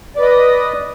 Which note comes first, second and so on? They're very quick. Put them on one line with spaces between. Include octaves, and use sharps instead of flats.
D5 B4 D#5 D#6